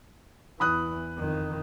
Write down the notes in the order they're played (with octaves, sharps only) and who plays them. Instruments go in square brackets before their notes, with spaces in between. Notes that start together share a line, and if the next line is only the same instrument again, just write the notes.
[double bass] E2 E3 [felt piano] B5 D#6 F#6
[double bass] F2 D#3